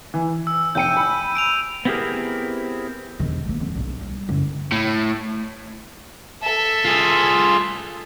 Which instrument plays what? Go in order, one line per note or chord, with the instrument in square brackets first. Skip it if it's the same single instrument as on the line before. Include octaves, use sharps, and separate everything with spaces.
[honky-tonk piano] E3
[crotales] E6
[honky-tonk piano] F1 G5 C#7 [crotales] G6 D#7
[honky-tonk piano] G#5 B5
[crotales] D7 D#7 F7
[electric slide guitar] B3 C4 E4 G4 G#4 A#4
[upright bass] E1 D#3
A3 A#3
F2
B1 G2
G3
F#1
[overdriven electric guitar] A2
[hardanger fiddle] A4 E5
[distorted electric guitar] F4 G#4